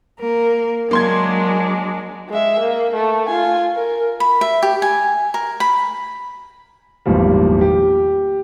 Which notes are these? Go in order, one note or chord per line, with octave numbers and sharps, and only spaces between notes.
A#3 A#4
F#3 G#3 A#3 D4 C6 G#6
G#3 E5
A#3
A3
F4 G#5
A#4
B5
E5
G4
G#5
A#4
B5
G#1 E2 A#2 F3 G3
G4